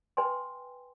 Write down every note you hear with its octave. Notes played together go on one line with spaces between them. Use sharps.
B4 G5 G#5 C6